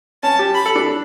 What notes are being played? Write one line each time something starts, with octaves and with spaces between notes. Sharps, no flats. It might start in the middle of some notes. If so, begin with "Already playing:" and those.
C#4 A5
G4
B5
A4
D4